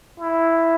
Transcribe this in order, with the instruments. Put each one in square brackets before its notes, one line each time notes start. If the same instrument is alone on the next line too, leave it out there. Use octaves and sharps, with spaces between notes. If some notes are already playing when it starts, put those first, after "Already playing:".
[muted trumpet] E4